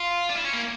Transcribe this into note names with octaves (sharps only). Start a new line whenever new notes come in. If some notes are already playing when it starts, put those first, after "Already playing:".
Already playing: F4
D4
E4
C#4
A#3